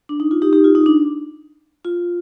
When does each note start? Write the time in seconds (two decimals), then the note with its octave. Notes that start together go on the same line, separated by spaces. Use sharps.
0.09 D4
0.20 D#4
0.31 F4
0.42 D#4 G4
0.53 D#4 G4
0.64 F4
0.75 D#4
0.86 D4
1.85 F4